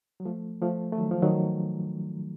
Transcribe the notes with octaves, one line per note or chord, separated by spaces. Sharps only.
F#3
F3 A3
F3 A3
A3
D#3 F#3
F3
D#3 F#3